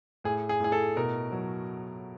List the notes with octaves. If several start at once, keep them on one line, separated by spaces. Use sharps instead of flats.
A2 G#4
G#4
A2 G#4
A4
B2 A#4
F#3